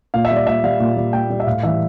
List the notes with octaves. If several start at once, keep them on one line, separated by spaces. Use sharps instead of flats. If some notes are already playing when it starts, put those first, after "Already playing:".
A#2 F5
E5
G3
D5
A#2 E5
G3 F5
A#2
G3
A#2 G5
G3
E5
A2 F5
E3 G3 E5